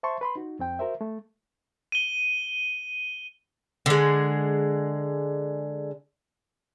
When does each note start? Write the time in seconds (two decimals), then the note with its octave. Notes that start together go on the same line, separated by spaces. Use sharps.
0.03 C5 E5 A5 C6 C#6
0.21 B4 B5 C6
0.36 D#4 F#4
0.59 F2 C4 G5
0.79 F#4 A#4 C5 E5
1.01 A3
1.92 D#7 G7
3.86 D3 G#3